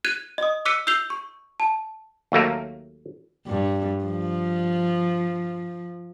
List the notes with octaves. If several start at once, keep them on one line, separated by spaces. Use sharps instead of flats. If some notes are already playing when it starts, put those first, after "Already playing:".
F#6 G#6 D#7
D#5 D#6
D6 E6 F#6 B6 C#7 D#7
E6 G6 C7 F7 G7
C#6
A5
D#2 F#3 A3 A#3
G2
F3